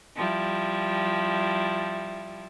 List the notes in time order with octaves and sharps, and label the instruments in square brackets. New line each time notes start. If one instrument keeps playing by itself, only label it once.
[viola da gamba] F3 G3 E4